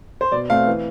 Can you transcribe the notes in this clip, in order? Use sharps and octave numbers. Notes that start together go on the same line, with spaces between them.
C5
B2 D5
A3 C4 F5
E3